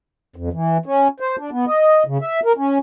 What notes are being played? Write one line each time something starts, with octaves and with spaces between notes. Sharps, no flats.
F2
E3
C#4
C5
D4
B3
D#5
C#3
E5
A#4
C#4